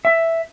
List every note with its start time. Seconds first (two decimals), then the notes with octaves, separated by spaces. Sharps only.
0.05 E5